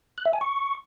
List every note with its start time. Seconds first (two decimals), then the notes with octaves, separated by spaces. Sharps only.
0.18 F#6
0.26 E5
0.33 G#5
0.41 C#6